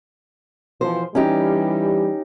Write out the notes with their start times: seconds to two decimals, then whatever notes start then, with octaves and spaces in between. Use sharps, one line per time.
0.81 B2 E3 F3 C5
1.15 E3 G3 C#4 D#4 G4